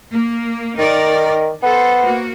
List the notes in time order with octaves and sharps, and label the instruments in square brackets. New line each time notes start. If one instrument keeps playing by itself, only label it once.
[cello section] A#3
[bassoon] D#3 [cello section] D#4 A#4 D5
[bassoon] B3 [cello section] A4 C5
[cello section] A#3 F#4